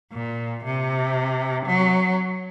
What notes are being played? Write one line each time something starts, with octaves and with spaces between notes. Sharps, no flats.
A#2
C3
F#3